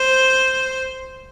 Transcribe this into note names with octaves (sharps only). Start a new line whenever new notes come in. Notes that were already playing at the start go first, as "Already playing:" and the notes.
Already playing: C5